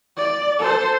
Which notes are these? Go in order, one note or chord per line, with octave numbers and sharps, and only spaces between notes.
D5
A4 C5